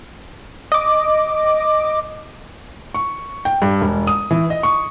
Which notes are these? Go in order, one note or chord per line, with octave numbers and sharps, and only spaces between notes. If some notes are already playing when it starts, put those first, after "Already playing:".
D#5 D6
C#6
G5
G2
E1
D#6
E3
D#5
C#6